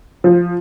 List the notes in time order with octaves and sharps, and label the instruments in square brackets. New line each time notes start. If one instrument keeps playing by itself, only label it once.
[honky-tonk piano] F3